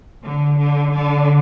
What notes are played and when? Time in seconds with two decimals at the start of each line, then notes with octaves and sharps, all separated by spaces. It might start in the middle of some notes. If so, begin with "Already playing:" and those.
0.23 D3
0.57 D3
0.92 D3